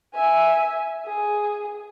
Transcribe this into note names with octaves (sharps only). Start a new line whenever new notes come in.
E5 G#5
G#4